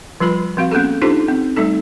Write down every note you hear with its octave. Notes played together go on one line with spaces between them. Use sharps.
F3 G3 F4 B4 B5
F3 C4 F#4 F5
A#3 B3 C#4 G#4 A4
D4 D#4 F4 G4 A4 C5
C4
G3 A3 D#4 A4